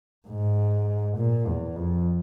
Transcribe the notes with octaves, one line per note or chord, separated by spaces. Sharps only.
G#2
A#2
E2
F2